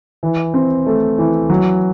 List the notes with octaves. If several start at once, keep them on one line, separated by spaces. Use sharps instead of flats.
E3
C4
A3
E3
F#3